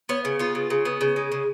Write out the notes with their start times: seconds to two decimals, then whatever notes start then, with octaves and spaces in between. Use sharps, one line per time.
0.09 B3 C#5
0.25 C#3
0.39 B3 F4
0.55 C#3
0.70 C#3
0.85 B3
1.01 C#3
1.16 G#3
1.32 C#3